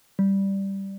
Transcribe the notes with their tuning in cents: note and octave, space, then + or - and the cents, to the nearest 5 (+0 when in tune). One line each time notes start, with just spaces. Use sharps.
G3 -5